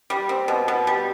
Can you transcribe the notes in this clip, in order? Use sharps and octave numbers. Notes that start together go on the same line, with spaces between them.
G3
C4
B2
B2
G3